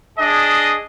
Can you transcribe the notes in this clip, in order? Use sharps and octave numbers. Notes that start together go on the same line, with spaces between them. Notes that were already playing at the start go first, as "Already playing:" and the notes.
D4 G#4 D#5